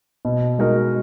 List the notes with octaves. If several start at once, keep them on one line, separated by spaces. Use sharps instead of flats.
B2
G#3 D#4 F#4 A#4